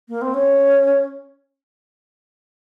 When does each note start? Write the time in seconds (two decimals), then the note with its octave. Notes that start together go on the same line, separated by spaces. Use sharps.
0.09 A#3
0.22 C4
0.34 C#4